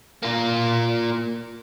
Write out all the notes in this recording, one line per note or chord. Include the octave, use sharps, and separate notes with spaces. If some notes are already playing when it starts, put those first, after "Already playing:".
A#3 F4